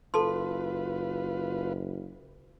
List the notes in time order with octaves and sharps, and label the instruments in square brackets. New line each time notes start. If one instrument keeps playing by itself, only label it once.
[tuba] F#1 [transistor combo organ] F4 B4 [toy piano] A4 A5 C6